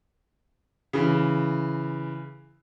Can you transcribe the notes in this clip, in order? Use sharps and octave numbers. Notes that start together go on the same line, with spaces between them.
C#3 E3